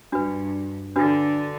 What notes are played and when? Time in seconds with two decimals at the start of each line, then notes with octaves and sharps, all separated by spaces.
0.12 G2 D4 F#4 B4
0.96 D3 D4 F#4 B4